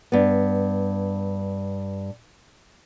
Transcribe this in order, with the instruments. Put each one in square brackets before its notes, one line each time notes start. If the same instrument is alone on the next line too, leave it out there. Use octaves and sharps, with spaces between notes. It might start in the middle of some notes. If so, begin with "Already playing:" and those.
[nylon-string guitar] G2 B3